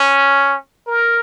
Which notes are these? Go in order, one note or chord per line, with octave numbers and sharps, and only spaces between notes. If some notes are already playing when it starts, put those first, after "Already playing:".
Already playing: C#4
A#4